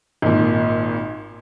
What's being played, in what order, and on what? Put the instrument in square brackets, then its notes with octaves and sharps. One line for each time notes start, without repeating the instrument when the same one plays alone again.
[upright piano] G#1 A#2